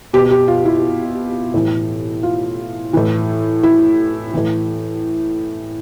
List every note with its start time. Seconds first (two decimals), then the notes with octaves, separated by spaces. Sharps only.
0.13 B2 G4
0.31 G4
0.48 F4
0.65 E4
1.54 A2 E3
2.23 F4
2.93 A2 E3 E4
3.63 E4
4.34 A2 E3